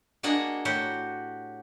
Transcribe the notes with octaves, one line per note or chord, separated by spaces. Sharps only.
A#3 D4 F#4 G#4 D#5
A2 F#4 G4 F#5